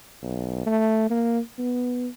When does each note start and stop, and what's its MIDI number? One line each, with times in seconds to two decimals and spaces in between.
0.22 0.63 35
0.66 1.07 57
1.10 1.39 58
1.58 2.08 59